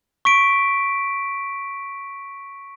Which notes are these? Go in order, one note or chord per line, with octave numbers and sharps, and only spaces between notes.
C#6 B6 D7